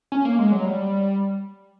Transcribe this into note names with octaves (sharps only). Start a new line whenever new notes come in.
C#4
A#3
G#3
F#3
G3